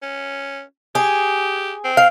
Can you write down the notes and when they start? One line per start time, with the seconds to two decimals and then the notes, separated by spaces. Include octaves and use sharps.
0.02 C#4
0.95 G4 G#4
1.84 C4
1.97 F5